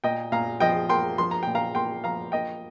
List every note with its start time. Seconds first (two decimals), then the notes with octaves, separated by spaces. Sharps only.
0.04 A#2 D#5 G5
0.32 A#2 F5 A#5
0.60 F3 D#5 G5
0.89 A#3 G5 C6
1.18 F3 C6
1.31 A#5
1.43 A#2 G5
1.55 F5 A#5
1.75 A#3 G5 C6
2.04 F3 F5 A#5
2.32 A#3 D#5 G5